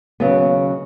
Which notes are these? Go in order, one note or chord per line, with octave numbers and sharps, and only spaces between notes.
D#2 C#3 F#3 B3